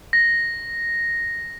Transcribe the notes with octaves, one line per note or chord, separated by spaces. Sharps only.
A#6